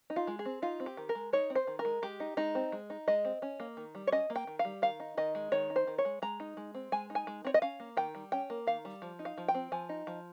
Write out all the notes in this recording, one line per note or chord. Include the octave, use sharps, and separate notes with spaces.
D#4
F4
G#3
G#4
C4
D#4 F4
C4
G4
D#3
A#4
G#3
D#4 C#5
C4
C5
D#3
A#4
G#3
G#3 G4
D#4
G#3 D#4
C4
G#3
D#4
G#3 D#5
C4
C#4
A#3
D#3
G3
C#5
C#4 D#5
A#3
G5
D#3
F5
G3
D#3 F5
D#4
D#3 D#5
G#3
D#3 C#5
D#4
C5
D#3
C#5
G#3
G#3 A#5
D#4
G#3
C4
G#3 G#5
D#4
G#5
G#3
C4 C#5
D#5
C#4 F5
A#3
D#3 G5
G3
C#4 G5
A#3
D#3 F5
G3
F3
D#4
F5
F3
G5
C4
F3 G#5
D#4
F3